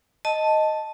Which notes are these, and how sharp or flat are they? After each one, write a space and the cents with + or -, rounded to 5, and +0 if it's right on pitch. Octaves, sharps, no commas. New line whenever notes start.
D#5 +0 A5 +0